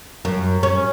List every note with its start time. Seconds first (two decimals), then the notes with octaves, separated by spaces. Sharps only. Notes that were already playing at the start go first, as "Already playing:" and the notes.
0.25 F#2
0.63 C#4